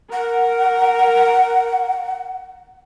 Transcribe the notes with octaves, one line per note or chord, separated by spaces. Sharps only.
A#4 F#5